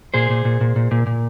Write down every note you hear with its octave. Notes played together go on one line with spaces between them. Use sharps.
A#2 G#4 C5
A#2
A#2
A#2
A#2
A#2
A#2